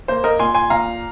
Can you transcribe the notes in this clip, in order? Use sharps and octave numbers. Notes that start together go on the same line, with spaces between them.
A#3 C5
A#4 D#5
A#2 G#5 C6
G#5 C6
A#2 F5 A#5